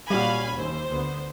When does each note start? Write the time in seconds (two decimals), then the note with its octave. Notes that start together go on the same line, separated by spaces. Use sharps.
0.10 A#2 G3 C#4 F#4 F5 G#5 B5
0.56 D#2 C5
0.90 D2 B3